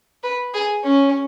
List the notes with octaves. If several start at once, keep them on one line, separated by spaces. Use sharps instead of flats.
B4
G#4
C#4